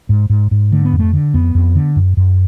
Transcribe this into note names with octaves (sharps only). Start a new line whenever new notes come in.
G#2
G#2
G#2
D3 A3
B3
F2
A3
D3
F2 B3
F2
D3
F#2
F#2